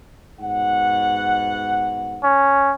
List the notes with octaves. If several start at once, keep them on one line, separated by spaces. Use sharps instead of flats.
G#2 B2 F#5
C#4